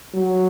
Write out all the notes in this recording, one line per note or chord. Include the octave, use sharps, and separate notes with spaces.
F#3